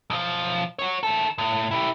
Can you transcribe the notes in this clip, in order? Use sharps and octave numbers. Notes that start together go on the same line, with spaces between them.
B1 F3
F#4 C#5
D#3 A4
A2
E4 G4